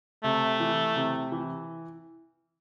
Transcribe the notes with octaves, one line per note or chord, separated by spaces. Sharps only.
C3 A3
E3
C3
E3